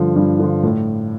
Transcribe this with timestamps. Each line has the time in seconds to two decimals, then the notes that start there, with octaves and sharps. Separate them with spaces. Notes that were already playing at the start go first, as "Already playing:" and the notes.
Already playing: G2 D3 F3
0.16 G2
0.40 D3 F3
0.63 A2